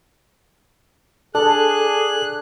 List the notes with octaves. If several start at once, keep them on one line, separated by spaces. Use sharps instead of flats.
D4 G#4 A4 F#6